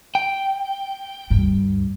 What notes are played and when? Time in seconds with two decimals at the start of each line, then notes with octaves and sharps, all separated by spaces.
0.15 G5
1.30 D2 G2